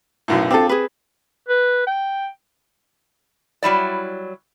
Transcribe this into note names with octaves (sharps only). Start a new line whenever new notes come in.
B1 F#2 A2
C4 D4 F4 A4
G#4 B4
B4
G5
F#3 G3 E4 D5